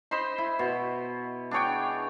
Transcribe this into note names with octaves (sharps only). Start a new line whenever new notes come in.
C5 D#5 B5 C6
E4
B2
D4 G#4 C#5 G5